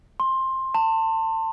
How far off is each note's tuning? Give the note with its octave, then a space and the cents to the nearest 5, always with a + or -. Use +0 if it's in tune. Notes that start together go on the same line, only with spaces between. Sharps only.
C6 +15
A5 +30